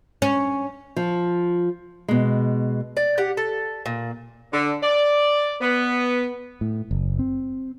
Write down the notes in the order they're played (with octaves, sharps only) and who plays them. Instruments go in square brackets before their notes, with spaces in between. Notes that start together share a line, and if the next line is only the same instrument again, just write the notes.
[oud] C#4
[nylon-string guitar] F3
B2 G#3
[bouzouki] D5
G4 F#5
A4
A#2
[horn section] D3
D5
B3
[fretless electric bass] A2
F#1
C4